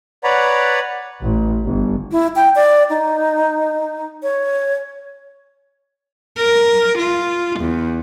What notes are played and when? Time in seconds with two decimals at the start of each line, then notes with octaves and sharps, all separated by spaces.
0.24 B4 C#5 D5 F#5 A#5 B5
1.23 A1
1.64 G1
2.12 E4
2.36 G5
2.55 D5
2.90 D#4
4.23 C#5
6.37 A#4
6.99 F4
7.61 E2